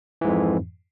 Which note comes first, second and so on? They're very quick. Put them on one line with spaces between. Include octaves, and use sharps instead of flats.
E3 G#2 F2